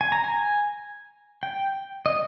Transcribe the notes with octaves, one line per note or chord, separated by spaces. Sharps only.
G#5
A#5
G#5
G5
D#5